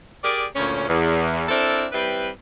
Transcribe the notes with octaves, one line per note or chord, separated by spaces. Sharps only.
G4 G#4 A#4 D5
D2 A#2 C#4
E2
C4 D4 E4 A4 A#4
G3 C4 E4 B4